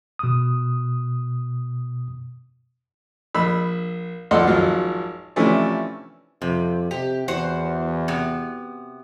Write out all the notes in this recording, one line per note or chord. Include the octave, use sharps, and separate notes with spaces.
B2 D#6
A#1 B5 E6
C2 F3 A4 D5 F#5 C6
G#1 F3 F#3 F5
C3 E3 F3 A3 C#4 D4
F2 C3
C3 G4
E2 F#4 C5
C3 B3